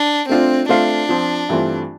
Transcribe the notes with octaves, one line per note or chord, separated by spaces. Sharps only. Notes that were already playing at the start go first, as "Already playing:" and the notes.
Already playing: D4
A3 C4 D4 F4
A3 C4 D4 F4 C5 F5
F3 C4 F4
G2 E3 A3 C4 F4